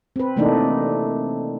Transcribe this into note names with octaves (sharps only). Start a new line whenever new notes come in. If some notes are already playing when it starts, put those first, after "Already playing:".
C4 B4
C3 E3 A3 A#3 D4 D#4